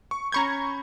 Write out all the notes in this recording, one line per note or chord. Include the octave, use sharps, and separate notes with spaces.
C#6
C#4 A#5 B5 C#6 G6 G#6